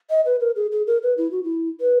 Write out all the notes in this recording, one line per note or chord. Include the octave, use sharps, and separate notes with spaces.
D#5
B4
A#4
G#4
G#4
A#4
B4
E4
F#4
E4
B4